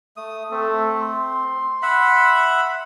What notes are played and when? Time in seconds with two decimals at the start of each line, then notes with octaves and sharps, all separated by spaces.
0.17 A3 D#6
0.51 A3 C4
0.99 C6
1.82 E5 F#5 B5